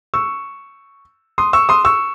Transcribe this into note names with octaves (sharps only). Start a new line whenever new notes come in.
C#6 E6
C6 D#6
C#6 E6
C6 D#6
C#6 E6